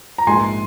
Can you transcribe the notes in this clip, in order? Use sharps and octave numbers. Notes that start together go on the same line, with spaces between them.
A#5
A#1 G#2 G#3 G#5 C6